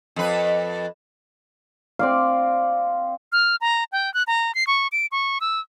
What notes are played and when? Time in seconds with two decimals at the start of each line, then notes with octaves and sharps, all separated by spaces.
0.16 F2 B4
1.99 C4 D5 F5
3.32 F6
3.61 A#5
3.92 G5
4.14 F#6
4.27 A#5
4.55 C7
4.67 C#6
4.92 D7
5.12 C#6
5.41 E6